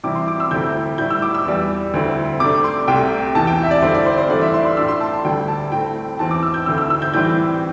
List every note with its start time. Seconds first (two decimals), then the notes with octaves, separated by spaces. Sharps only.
0.04 C3 E3 G3 C4 E4 D6
0.15 C6
0.28 D6
0.40 E6
0.51 D2 C3 A3 C4 E4 G6
0.98 A2 G3 E4 G6
1.10 E6
1.22 D6
1.34 E6
1.45 E2 E3 G3
1.94 D2 D3 C4 E4
2.40 C3 A3 D4 D6
2.64 C6
2.88 C2 C3 A3 G5
3.35 E2 C3 E3 A5
3.47 G5
3.63 E5
3.71 D5
3.82 G2 D3 C4 E4 C5
3.95 D5
4.06 C5
4.18 C5
4.29 G2 E3 A3 D4 D5
4.42 E5
4.54 C6
4.65 C6
4.77 A2 A3 D4 E6
4.88 C6
5.01 A5
5.13 A5
5.25 D2 D3 G3 D4 G5
5.48 A5
5.72 A2 A3 C4 G5
6.19 E2 E3 C4 A5
6.31 D6
6.42 E6
6.54 G6
6.66 D2 D3 C4 E4 E6
6.78 E6
6.90 E6
7.02 G6
7.14 A2 E3 G3 C4 G6